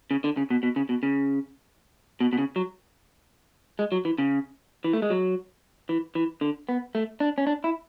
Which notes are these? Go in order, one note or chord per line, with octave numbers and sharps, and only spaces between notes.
C#3
D3
C#3
B2
B2
C#3
B2
C#3
B2
B2
C#3
F#3
G#3
F#3
E3
C#3
E3
A3
G#3
F#3
E3
E3
D3
B3
A3
D4
C#4
D4
E4